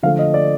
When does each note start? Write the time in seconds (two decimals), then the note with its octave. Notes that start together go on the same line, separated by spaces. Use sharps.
0.03 D3 F3 A3 F5
0.19 D#5
0.34 D5